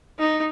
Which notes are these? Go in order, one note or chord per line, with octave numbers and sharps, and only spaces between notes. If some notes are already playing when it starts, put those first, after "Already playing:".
D#4